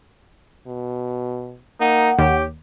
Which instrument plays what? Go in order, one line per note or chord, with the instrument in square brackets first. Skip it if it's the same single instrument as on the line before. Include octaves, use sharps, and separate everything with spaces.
[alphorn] B2
[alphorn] A#3 [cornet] D#4 [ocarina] F#5
[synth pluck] D#2 [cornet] G4 [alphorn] C#5